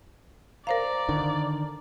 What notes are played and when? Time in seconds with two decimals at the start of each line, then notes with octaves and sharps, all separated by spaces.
0.67 A#4 C5 D5 F5 A#5
1.09 D3 D#3